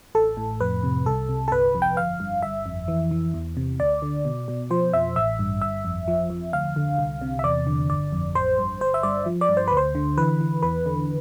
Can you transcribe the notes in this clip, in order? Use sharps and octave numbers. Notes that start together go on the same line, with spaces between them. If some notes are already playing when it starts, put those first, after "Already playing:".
A1 A4
A2
F2 B4
C3
C2 A4
C3
A4
G1 B4
F2
G5
G1 F5
G2
G1 E5
F2
E3
E3
E2
C3
D2 D5
D3
B2
B2
F3 C5
F2 E5
A1 E5
G2
G1 E5
F2
F3
F2
D2 F5
D3
C2
C3
E5
E2 D5
D3
G1 D5
F2
A1 C5
G2
G1 C5
E5
G2 D5
F3
D5
G2
C5
D2 B4
C5
D3
E3 B4
E3
E2 B4
D3